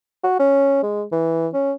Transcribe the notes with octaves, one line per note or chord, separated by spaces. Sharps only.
F#4
C#4
G#3
E3
C#4